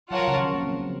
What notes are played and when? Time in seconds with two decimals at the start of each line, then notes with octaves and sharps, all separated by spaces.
0.11 F#3 F4 A#4 C#5 F#5 A5
0.19 F3
0.28 C#3
0.37 D#3
0.54 A#3
0.63 C4
0.71 F3
0.80 F#3